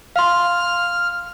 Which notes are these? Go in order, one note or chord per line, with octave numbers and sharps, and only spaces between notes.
F5 C6 F6